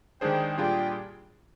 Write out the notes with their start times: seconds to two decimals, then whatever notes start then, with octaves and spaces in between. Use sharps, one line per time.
0.21 D#3 G#3 D4 G4 G#4 C5 G5
0.57 A#2 G3 D4 F4 G4 G#4 G5